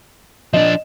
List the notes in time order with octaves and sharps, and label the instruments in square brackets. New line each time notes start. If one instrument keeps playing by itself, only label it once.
[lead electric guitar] F3 D4 [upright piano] D#5